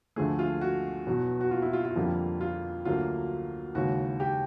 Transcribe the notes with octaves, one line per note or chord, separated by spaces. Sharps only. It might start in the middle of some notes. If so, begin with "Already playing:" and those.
D2 D3 F3 A3 G#4
F4
F#4
E2 B2 F#3
F#4
F4
E4
F4
F4
F2 D3 G3 A#3
F4
D2 D3 F#3 A#3 F4
D#2 C#3 E3 G#3 F#4
G4